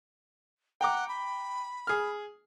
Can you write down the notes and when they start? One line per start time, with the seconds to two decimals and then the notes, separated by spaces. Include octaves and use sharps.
0.81 F#5 G5 A#5 D6
1.08 B5
1.87 G#4 F6